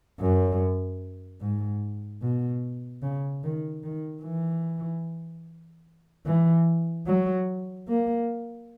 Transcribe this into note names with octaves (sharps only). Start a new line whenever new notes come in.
F#2
G#2
B2
C#3
D#3
D#3
E3
E3
F#3
A#3